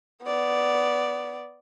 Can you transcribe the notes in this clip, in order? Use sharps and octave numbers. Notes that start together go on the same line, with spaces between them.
B3 D5